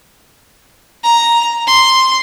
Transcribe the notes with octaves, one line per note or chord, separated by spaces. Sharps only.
A#5
C6